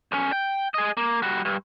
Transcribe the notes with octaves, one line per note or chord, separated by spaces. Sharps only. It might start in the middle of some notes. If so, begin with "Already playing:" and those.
B1 C#4
G5
G#4 D#5
A#3
G3 F#4
G2